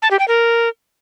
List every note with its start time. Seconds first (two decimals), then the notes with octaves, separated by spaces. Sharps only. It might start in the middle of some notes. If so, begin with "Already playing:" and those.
0.02 A5
0.11 G4
0.19 G5
0.28 A#4